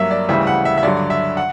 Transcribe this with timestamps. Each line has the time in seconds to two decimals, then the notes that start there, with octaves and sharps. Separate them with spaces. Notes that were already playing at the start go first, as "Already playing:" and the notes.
Already playing: G2 F#3 A#3 E5
0.11 D5
0.28 D2 C#3 E3 G3 E5
0.47 F#5
0.65 E5
0.78 E5
0.83 G2 D3 F#3 D5
1.10 E5
1.37 F#5